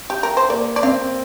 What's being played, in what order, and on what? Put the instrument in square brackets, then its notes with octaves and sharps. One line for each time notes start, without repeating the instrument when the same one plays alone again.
[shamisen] G4
A#4
C5
[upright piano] A#3 [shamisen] D5
[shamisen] D5
[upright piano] C4 [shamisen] F5